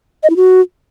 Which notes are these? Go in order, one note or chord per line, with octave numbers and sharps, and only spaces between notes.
D#5
E4
F#4